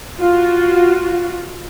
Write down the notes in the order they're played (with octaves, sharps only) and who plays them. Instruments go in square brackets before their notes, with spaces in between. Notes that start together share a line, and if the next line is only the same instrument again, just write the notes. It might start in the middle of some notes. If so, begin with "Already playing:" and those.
[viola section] F4 F#4